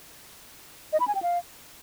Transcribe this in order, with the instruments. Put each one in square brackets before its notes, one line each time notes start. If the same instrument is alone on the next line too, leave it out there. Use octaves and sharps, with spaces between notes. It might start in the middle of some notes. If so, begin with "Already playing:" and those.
[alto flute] D#5
B5
G#5
G5
F5